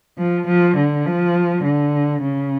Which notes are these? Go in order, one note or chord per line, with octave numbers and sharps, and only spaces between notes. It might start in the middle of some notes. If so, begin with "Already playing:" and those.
F3
F3
D3
F3
D3
C#3